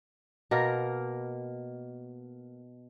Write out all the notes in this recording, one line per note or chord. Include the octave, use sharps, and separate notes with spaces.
B2 A#3 A#4